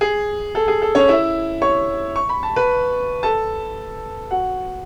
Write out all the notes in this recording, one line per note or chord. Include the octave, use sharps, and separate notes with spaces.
G#4
A4
G#4
A4
C#4 C#5
E4 E5
C#5 C#6
C#6
B5
A5
B4 B5
A4 A5
F#4 F#5